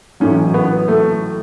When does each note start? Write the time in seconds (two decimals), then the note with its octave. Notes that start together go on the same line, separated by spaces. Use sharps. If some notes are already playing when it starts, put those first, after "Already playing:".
0.20 A1 A2 F#3 C#4
0.54 B3
0.88 A3